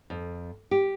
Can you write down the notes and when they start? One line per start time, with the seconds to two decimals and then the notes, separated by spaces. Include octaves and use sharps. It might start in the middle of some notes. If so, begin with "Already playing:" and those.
0.10 F2
0.71 G4